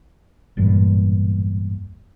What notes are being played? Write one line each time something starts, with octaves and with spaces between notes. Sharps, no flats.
E1 A1 G2 A#2